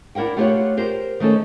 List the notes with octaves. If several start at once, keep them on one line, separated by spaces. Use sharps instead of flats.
D4 E4 A#4 F#5 G5
A3 F4 G4 B4 C#5 F#5
G4 A#4 C5
D#3 A3 C#4 A4